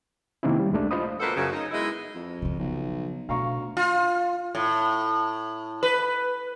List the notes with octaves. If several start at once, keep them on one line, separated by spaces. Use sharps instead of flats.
C3 D#3 A#3 C4 C#4 E4
G3
C2 G#3 A3 D4
F4 C5 D#5 B5 D#6
D2 A#3 B3 A4 B4 C5
F#2 C#3
D#4
G#3 B3 D#4 E4
F2
C#3 F3
B1
D2 B2 F5 A#5 C#6
F4
A2
B4